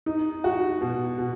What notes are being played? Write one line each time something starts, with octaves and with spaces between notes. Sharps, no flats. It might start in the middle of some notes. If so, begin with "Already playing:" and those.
D#4
F#4
B2
B2